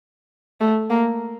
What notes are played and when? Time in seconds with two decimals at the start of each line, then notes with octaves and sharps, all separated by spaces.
0.61 A3
0.90 A#3